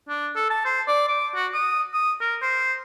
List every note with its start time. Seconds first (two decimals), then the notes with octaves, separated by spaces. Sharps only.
0.08 D4
0.36 A4
0.50 A5
0.65 C5
0.87 D5
1.08 D6
1.35 F#4
1.54 D#6
1.94 D#6
2.21 A#4
2.42 C5